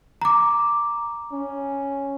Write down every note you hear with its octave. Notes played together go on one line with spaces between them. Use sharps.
A#5 D6
C#4